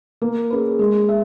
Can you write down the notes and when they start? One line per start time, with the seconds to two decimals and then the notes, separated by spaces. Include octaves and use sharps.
0.22 A#3
0.50 C#4 G#4 B4
0.79 G#3
1.09 E5